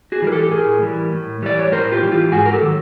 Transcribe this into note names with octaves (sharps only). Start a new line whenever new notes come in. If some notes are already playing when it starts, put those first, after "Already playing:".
F#4 G#4
E3 G3 A#4
G4 A4
A4
A2 G#4 A#4
E3 G3
A2
E3 G3 D5
C#5
A2 A#4 C5
F4 G4
E3 G3
F4 G4
G#2 F#4 G#4
A#4
G4 A4
D#3 F#3